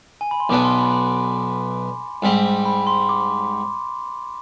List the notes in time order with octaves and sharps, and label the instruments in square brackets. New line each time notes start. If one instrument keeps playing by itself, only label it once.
[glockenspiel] G#5
B5
C6
[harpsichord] B1 B2 B3 D4 [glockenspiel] D6
[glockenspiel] C6
B5
B5
[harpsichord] G#2 G3 C4
[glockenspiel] B5
C6
D6